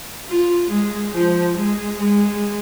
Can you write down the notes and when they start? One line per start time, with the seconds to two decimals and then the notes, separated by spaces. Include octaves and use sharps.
0.28 F4
0.70 G#3
1.14 F3
1.56 G#3
1.99 G#3